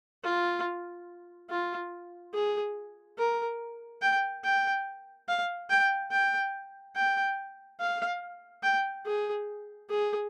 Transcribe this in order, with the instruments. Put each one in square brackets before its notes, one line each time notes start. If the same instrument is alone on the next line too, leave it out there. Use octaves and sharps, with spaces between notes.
[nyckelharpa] F4
F4
G#4
A#4
G5
G5
F5
G5
G5
G5
F5
G5
G#4
G#4